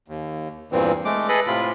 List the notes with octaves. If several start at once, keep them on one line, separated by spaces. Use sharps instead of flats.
D#2
E2 G2 A#2 E3 C4
G#3 A3 D6
G#4 A4 B4 D#5 B5
A2 C3 F4 B5